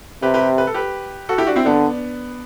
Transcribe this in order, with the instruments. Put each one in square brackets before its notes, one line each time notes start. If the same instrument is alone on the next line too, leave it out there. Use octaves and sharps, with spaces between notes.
[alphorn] C3 [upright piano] G4 B4
[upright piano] G4 B4
B4
A4
G4 B4
F#4 A4
E4 G4
D4 F#4
C4 E4
[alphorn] D3 [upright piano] B3 D4